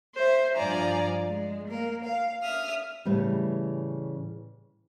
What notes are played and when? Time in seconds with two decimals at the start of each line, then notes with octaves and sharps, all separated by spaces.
0.14 C5 E5
0.56 G2 F3 D5 G#5 A#5
1.25 G#3
1.68 A#3 A#4
2.04 F5
2.42 E5 D#6 F6
3.05 A2 C#3 E3 G3